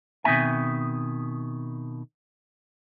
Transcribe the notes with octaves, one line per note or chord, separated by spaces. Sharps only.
B2 D#3 C4 C#4 E5 G#5